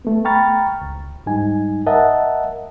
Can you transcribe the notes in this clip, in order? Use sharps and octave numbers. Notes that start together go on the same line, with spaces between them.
A3 B3
G5 A#5 B5 C#6 F6 A6
C#2
G#2 G3 D#4 G#5
A#4 D#5 E5 F#5 A5